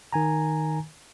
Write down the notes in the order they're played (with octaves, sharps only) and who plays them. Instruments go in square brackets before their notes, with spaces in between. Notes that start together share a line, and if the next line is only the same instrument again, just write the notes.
[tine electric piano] D#3 G#5 A#5